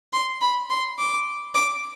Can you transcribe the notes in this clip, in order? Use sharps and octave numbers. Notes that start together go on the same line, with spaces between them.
C6
B5
C6
D6
D6